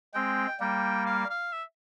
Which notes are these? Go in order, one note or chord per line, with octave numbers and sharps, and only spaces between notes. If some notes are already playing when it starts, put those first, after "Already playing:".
G#3 C4 G5
G3 A#3 G5
F5
F5
E5